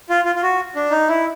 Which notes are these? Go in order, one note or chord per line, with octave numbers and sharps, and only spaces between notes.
F4
F4
F4
F#4
D4
D#4
E4